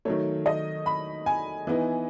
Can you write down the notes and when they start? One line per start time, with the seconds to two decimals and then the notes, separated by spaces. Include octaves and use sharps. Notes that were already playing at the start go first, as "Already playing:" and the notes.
0.05 D#3 F#3 A3 C#5
0.46 D#5
0.86 B5
1.26 G#5
1.67 E3 B3 D#4